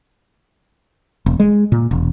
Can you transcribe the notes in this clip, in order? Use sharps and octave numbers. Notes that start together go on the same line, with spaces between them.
E1
G#3
A#2
E1